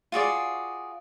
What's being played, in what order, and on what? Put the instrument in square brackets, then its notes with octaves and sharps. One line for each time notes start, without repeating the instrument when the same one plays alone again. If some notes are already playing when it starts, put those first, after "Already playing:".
[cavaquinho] F4 F#4 G#4 D5